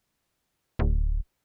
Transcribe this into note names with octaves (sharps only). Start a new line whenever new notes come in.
D1